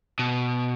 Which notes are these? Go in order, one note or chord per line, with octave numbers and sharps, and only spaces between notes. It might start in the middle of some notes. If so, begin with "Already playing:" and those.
B2